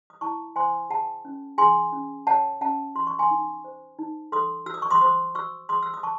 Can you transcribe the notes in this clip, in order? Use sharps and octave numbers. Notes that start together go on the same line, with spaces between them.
D#6
E4 A5 C#6
C5 G#5 C6
G#4 F#5 A5
C#4
G#4 G#5 C6
C#4
C#5 F#5 A5
C#4 F#5 A5
F#4 C6
C#6
G#5 C6
D#4
C5
D#4
A4 C6 D#6
F#4 E6
D#6
C#6
C6 D#6
C5 C6 D#6
F#4 C#6 E6
G#4 C6 D#6
E6
D#6
A5 C#6